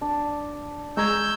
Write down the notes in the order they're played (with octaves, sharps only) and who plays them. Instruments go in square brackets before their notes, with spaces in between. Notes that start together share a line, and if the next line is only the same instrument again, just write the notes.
[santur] D4
[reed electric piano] G#3 A#5 G#6 [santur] C#5 [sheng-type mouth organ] E6 G6